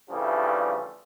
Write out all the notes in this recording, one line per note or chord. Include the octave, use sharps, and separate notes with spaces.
G2 C#3 E3 F3 G3 A3